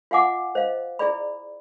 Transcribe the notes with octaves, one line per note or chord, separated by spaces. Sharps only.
F4 D#5 F5 F#5 G#5 D6
C5 D#5 F5
E4 G#4 D5 B5